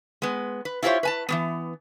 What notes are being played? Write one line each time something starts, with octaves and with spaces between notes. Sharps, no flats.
G#3 B3
B4
E4 F4 G4 A4 C5 C#5
B4 G#5 A5
E3 G3 B3